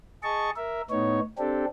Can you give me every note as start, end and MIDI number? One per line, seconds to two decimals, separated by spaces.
0.23 0.50 68
0.23 0.50 75
0.23 0.50 81
0.23 0.50 85
0.56 0.81 70
0.56 0.81 76
0.90 1.20 45
0.90 1.20 59
0.90 1.20 63
0.90 1.20 73
1.38 1.65 60
1.38 1.65 62
1.38 1.65 67
1.38 1.65 69